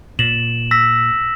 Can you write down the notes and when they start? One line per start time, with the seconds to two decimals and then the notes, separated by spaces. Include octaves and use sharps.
0.19 A#2 E7 F#7
0.71 E6 A#6 B6